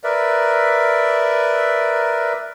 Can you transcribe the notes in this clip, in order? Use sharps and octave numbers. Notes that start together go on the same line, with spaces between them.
A#4 B4 D5 E5